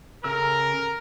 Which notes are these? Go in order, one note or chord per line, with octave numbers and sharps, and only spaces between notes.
C#3 A4 A#4 E6